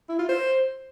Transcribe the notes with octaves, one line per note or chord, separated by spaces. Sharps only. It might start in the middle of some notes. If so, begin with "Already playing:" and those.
E4
F4
C5